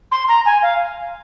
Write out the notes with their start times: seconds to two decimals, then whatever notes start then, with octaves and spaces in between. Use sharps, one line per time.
0.11 C6
0.28 A#5
0.46 G#5
0.62 F5